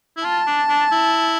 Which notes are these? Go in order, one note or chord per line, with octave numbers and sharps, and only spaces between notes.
E4
F4 A5
D4
D4
E4